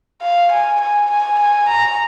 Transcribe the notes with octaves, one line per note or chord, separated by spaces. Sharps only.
F5
G#5
G#5
G#5
G#5
A#5